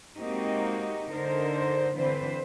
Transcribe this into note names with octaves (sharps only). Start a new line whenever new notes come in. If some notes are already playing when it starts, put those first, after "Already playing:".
G#3 A#3 C4 D#4 F#4 G4
D3 D#4 A#4 C5
D3 E3 C4 B4 C5